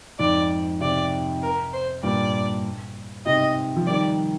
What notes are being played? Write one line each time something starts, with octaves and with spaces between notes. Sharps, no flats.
F2 G#2 D5
G#2 C3 D5
A#4
C5
G2 A#2 D5
G#2 C3 D#5
F3
D#3 G3 D5